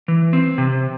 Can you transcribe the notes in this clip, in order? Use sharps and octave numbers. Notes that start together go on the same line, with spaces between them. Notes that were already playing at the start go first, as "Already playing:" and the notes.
E3
C4
C3